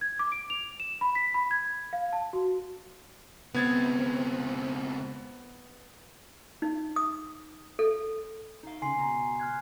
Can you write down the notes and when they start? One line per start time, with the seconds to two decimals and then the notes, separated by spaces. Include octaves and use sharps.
0.01 G#6
0.19 D6
0.32 D7
0.50 F7
0.80 E7
1.01 B5
1.15 B6
1.34 B5
1.51 G#6
1.93 F5
2.13 A5
2.33 F#4
3.54 C#2 B3 C4 G#6 A6
6.62 D#4
6.96 D#6
7.79 A4
8.63 D#4 F5
8.82 C#3 C#4 G#5 C6 C7
8.97 C#2 B2 A#5
9.40 F6 F#6 G#6